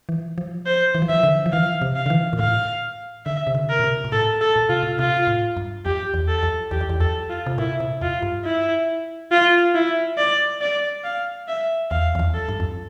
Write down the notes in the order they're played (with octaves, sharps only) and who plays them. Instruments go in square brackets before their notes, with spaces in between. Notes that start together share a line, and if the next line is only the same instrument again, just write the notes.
[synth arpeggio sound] E3
F3
[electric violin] C5
[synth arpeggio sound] E3
F3
[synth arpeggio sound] E3 [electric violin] E5
[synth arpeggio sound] D3
F3
[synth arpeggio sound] E3 [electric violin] F5
[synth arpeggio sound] C3
[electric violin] F5
[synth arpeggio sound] D3
E3
A#2
[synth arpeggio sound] A2 [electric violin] F5
[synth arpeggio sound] D3 [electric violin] E5
[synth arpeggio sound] C3
D3
[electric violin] A#4
[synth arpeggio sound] A#2
C3
A#2
[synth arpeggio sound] A2 [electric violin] A4
[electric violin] A4
[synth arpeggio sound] A#2
[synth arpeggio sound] C3 [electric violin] F4
[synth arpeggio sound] A#2
[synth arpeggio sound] C3 [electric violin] F4
[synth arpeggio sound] A2
G2
[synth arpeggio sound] F2 [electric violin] G4
[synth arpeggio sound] E2
[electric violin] A4
[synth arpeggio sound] F2
[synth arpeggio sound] E2 [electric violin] G4
[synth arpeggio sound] F2
E2
[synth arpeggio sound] F2 [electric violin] A4
[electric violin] F4
[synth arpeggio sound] C3
[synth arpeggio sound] A#2 [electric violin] E4
[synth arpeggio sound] C3
[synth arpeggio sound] F2 [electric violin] F4
[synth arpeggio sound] G2
[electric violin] E4
F4
E4
D5
D5
F5
E5
[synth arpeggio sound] E2 [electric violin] F5
[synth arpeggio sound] E2
F2
[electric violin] A4
[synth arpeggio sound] G2
F2